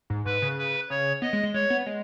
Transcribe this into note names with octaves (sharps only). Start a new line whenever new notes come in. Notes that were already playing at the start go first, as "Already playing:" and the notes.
G#2
G#2 B4
C#3
B4
C#3 C#5
B3 D#5
G#3
G#3
G#3 C#5
B3
G#3